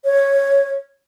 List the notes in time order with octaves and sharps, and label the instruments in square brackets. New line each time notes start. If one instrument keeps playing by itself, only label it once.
[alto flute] C#5